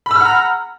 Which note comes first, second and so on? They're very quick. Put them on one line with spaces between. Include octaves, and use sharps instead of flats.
B5 E6 F6 F#5 A#5